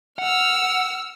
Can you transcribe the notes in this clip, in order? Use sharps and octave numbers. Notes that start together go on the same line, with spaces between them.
F#5 E6 F6